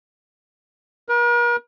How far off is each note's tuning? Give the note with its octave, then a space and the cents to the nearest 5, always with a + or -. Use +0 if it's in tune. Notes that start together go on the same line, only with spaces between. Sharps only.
A#4 +45